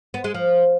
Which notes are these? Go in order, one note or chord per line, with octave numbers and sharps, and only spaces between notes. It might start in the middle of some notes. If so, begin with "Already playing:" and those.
B3
G#3
F3